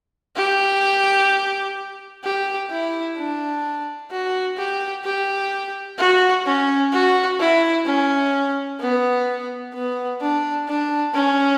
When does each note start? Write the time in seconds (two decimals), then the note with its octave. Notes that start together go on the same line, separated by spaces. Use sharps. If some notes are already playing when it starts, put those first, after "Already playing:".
0.36 G4
2.24 G4
2.70 E4
3.17 D4
4.11 F#4
4.57 G4
5.05 G4
5.98 F#4
6.46 C#4
6.92 F#4
7.40 E4
7.86 C#4
8.80 B3
9.74 B3
10.21 D4
10.68 D4
11.15 C#4